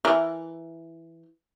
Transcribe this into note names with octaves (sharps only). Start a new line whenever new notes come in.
E3 A#4